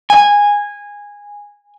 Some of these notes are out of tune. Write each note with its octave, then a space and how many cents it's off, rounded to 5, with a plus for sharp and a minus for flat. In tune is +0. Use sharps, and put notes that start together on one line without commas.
G#5 -15